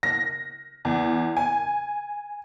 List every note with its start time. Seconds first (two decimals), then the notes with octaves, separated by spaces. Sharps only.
0.03 A#6
0.85 E2
1.37 G#5